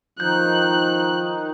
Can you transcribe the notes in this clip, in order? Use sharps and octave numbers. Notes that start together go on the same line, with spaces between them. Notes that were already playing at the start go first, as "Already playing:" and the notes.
D#3 F3 D#4 F#6 G6